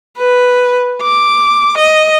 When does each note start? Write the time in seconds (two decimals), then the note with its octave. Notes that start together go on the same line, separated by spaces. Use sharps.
0.18 B4
1.02 D6
1.78 D#5